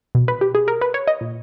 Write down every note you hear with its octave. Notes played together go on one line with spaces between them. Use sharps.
B2
B4
G4
G#4
A#4
B4
C#5
D#5
A#2